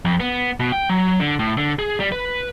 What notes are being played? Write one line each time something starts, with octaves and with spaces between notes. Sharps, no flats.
F2
B3
B2
G5
F#3
D3
A2
D3
G#4
G3
B4